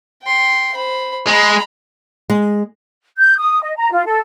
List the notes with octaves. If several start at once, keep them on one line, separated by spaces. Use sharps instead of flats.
G5 C6
C5 B5
G#3 A#5 B5
G#3
G6
D#6
D#5
A#5
F4
A4